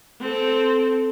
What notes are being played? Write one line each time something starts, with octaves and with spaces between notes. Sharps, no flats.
C4 A4